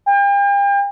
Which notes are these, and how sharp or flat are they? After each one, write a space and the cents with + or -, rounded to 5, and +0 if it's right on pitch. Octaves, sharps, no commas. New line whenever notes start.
G5 +40